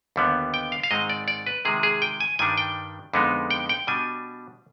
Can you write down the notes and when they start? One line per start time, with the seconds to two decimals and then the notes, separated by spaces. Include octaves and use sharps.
0.16 D#2 D3 G3 B3
0.54 G5
0.72 F5
0.83 F5
0.91 G#2 D#3 G#3 C4 D#4 D#5
1.10 D5
1.28 D5
1.47 B4
1.65 C3 D#3 G#3 G#4
1.83 G#4
2.02 G5
2.20 G#5
2.39 G2 D#3 G3 D4 G#5
2.58 G5
3.13 F2 D3 G#3 B3 D#4
3.51 G5
3.69 G5
3.87 B2 G3 D4 G#5